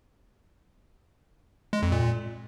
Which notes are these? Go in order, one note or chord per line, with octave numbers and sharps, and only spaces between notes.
G#3
F2
A#2